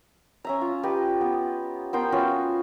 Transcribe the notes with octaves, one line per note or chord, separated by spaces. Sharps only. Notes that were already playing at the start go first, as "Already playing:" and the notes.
C#4 E5 A#5
F4
G4 B4 D#5
B3
B3 A#4 C5 G5
C#4 F4 F#4 B4